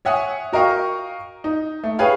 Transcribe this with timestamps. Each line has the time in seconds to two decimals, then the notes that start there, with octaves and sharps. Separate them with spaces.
0.05 C#5 E5 F#5 G#5 D#6
0.53 F#4 A#4 D#5 F5 G5 C#6
1.44 D#4
1.84 A3
1.99 G#4 B4 C#5 F5 G5